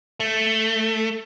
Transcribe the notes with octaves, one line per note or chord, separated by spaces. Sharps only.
A3